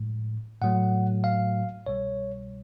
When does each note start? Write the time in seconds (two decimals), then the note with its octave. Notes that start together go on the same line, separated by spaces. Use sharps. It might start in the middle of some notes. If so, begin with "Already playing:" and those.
Already playing: A2 F3 G#3
0.61 A2 F#3 A3 F#5
1.24 F5
1.86 C2 B2 G3 C#5